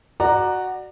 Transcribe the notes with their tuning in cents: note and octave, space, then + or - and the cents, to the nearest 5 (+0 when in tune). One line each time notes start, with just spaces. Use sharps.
F#4 +0 D5 +25 A#5 +0